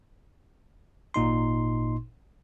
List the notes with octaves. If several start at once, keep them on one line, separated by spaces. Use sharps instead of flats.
G#1 A#2 D#4 C6